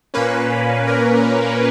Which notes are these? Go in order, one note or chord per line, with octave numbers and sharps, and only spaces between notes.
A#2 A#3 C#4 B4
A#4